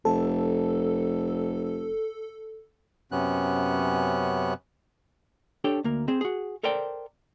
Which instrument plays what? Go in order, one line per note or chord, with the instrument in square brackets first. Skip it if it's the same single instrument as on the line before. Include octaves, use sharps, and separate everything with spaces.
[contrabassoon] F1 [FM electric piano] A4
[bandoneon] F#2 C3 B3 C#4 F#6
[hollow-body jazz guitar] D4 G4 A4 C#5 G5
D2 A#3 A#4
C4 G#4 C5
F#4 G#4
A4 A#4 C5 D5 G5